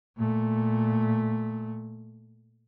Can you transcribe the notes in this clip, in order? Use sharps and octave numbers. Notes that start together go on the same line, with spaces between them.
A#2 A3